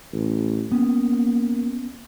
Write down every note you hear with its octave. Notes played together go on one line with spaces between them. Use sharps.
A1
A#3 B3 C#4